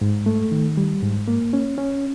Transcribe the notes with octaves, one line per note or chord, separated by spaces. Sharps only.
G#2
A3
D#3
G3
G#2
A#3
C#4
C#4